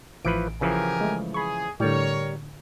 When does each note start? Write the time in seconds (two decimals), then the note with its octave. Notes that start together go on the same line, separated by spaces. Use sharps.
0.25 A1 E3 F3 B4 D7
0.61 C#3 E3 F3 G4 A#4 G#5
1.01 G#3 A3
1.34 G#4 B5 C#6
1.80 A2 D3 G3 A#4 C#5